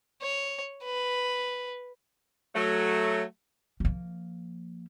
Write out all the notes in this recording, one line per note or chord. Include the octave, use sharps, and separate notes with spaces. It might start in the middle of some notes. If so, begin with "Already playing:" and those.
C#5
B4
F#3 A3
F3 A#3